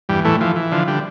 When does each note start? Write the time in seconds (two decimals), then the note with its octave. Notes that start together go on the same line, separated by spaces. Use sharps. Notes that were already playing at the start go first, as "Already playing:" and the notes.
0.09 E2 G2 G3
0.25 A2 E3 A3
0.40 E3 F3
0.56 E3
0.72 D3 F3
0.88 D3 G3